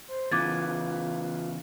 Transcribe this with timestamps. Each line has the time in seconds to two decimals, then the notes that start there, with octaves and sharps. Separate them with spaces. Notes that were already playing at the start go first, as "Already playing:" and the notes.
0.08 C5
0.32 C#3 E3 B3 F4 D6 G#6 A6